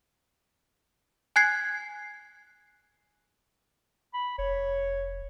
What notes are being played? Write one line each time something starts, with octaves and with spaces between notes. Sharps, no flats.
G#5 F#6 G#6 C7
B5
F1 C#5